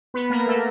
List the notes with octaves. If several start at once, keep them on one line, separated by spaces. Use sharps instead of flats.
B3 B4
A#3 A#4
A3 A4